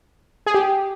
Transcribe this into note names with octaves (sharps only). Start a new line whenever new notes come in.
G#4
G4